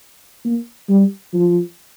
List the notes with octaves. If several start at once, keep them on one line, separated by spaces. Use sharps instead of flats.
A#3
G3
F3